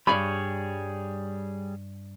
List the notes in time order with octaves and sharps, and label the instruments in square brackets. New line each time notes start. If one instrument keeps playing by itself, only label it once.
[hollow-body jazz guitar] G2 D5 B5 [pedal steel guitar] G3 G#4 C#5